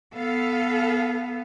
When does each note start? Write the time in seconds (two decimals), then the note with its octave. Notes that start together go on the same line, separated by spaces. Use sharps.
0.16 B3 A4 F5